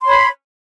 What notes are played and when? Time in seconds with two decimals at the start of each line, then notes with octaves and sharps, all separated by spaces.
0.01 C6
0.05 C#5
0.08 B5